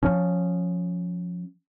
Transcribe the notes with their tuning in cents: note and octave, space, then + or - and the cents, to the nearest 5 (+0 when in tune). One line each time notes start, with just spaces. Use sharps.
F3 +20 C#4 +0